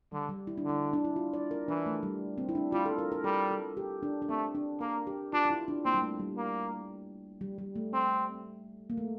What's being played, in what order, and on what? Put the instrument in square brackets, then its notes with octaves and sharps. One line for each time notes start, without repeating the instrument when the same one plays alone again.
[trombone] D3 [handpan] G3
[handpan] G3
E4
D4
[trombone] D3
[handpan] E4
D4
E4
F4
D5
A#4
[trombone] E3 [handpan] D4
[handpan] A3
G3
C4
E4
D4
[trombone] G3 [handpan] F4
[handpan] A4
A#4
A#4
[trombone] G3 [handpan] A4
[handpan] A4
G4
D4
D4
[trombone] A3 [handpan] C4
[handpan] D4
[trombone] A#3 [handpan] A#4
[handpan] G4
[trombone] D4 [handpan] F4
[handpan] F4
E4
D4
[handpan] A#3 [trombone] C4
[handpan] G3
A3
G3
[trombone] A#3
[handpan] G3
G3
A3
[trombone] C4
[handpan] A#3
A3